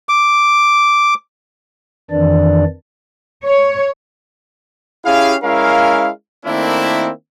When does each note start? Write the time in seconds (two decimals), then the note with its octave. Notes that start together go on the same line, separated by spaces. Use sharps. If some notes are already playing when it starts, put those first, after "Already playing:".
0.09 D6
2.10 F2 D#3 E3 D4 D5
3.45 C#5
5.05 C#4 E4 G4 G#4 F5
5.44 G#3 C#4 E4 A#4 F5
6.46 D#3 A3 A#3 C4 D4 E4